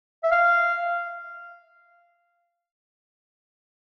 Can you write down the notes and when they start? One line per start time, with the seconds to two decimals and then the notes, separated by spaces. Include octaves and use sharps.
0.24 E5
0.32 F5